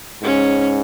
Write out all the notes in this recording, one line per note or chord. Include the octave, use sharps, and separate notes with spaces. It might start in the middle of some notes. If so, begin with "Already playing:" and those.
G#2 C#4